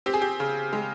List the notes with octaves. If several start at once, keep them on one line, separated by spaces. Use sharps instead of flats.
C4 G4
G#4
G4
C#3
G#3